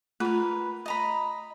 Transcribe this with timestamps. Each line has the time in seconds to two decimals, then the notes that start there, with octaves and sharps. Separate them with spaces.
0.20 A3 F4 A#4 B4
0.86 D#5 A#5 B5